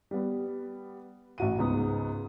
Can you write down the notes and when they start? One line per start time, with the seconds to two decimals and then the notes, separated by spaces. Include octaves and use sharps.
0.11 G3 B3
1.38 A1 F#4 D#7
1.58 C#2 G#2 B3 D#6